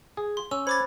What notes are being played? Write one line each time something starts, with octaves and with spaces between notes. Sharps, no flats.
G#4
C6
C#4 E6
C5 B5 D6 G#6 A6